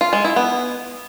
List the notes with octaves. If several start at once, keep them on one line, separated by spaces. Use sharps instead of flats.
F4
G#3
E4
B3